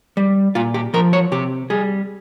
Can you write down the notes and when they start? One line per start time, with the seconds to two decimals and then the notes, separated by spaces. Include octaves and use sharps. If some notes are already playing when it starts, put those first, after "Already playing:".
0.17 G3
0.55 A#2 F4
0.74 G4
0.94 F3 A#4
1.13 C#5
1.32 C3 G4
1.70 G3 G#4